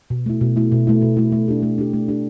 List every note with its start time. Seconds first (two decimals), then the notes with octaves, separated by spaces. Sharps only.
0.10 B2
0.26 A3 E4
0.41 B2
0.56 A3 E4
0.72 B2
0.87 A3 E4
1.02 B2
1.17 A3 E4
1.32 A3
1.48 D4 G4
1.62 A3
1.78 D4 G4
1.93 A3
2.08 D4 G4